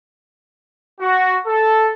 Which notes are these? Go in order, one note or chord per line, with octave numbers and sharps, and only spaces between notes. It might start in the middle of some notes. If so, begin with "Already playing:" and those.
F#4
A4